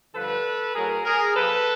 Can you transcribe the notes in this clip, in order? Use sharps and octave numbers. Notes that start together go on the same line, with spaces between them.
G2 D3 F3 A4 B4
A2 F#3 G#4 A#4
G#4 A#4
A#2 F3 A4 B4